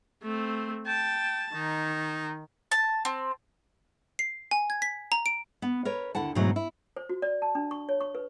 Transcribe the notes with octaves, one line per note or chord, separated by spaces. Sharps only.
A3 C4
G5 A5
D#3 D#4
A5
C4
C7
G#5
G#6
B6
A#5
D7
B3
A#4 B4 C#5
D#2 D3 E4 F#5 A5
G#2 B2 D3 E3 F#3 A3
E4
C5
F#4
D5
A5
D4
C#6
C#5
C#6
B4